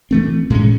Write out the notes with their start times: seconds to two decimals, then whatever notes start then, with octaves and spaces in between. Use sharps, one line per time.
0.11 E3 A3 C4
0.50 A2 G#3 C#4